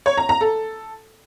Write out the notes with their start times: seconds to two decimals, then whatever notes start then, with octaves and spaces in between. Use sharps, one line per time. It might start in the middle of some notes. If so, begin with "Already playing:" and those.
0.06 C#5
0.17 A#5
0.29 A#5
0.41 A4